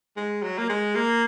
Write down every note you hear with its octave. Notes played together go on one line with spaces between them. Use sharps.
G#3
F#3
A#3
G#3
A#3